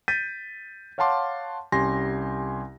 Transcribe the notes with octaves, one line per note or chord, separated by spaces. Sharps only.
G6 A6 B6 D#7
C#5 F5 F#5 A5 C6 D6
C2 C#4 G4 G#5 C6 A#6